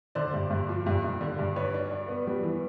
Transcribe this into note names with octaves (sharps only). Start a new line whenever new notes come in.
D3 C5 D5
G2
G2
F3
G2
G2
D3
G2
D4 B4 C#5
D4
D4
B3
G3
E3